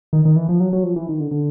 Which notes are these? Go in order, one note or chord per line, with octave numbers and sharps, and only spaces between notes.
D#3
D#3
E3
F3
F#3
F#3
F3
E3
D#3
D3
D3